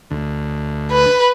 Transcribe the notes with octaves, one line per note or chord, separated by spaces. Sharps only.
D2
B4